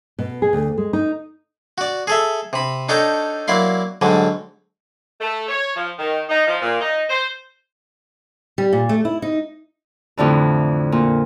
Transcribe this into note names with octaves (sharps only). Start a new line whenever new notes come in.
B2
G#4
D2
G#3
D#4
F#4 D5
G#4 A4 E5
C3 B5
D4 D#4 A4 C#5 G5 A#5
F#3 A#3 E4 D5 C6
G#2 D3 F#3 G3
A3
C#5
F3
D#3
D#4
F3
A#2
D#4
C5
G3
A#2
A3
E4
D#4
F2 A2 D3 E3
A#2